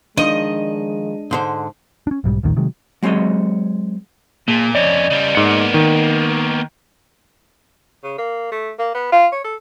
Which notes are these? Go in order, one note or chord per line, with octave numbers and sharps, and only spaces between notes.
D#3 F3 G#3 D4 D#5
G#2 D3 C5
C#4 D4
B1 G#2 G3
A#1 D#2 A2 D#3
C3 D#3 F#3 G#3
F#3 G#3 C4 C#5 D#5
A#2 A#3 G#4
F2 C#4 D5 D#5
C#3 G3
G#2 A#3 B3 C#7
D#3
C#3
A#3
A3
A#3
B3
F4
C#5
A4